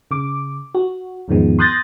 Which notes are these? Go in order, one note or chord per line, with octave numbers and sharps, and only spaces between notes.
C#3 D6
F#4
E2 G#2 D#3 F3 G#3 B3
C6 D#6 F#6 G6 A6 A#6